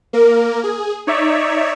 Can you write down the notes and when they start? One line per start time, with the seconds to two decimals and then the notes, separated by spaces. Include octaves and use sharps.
0.13 A#3 A#4
0.64 G#4
1.07 D#4 C#5 D5 E5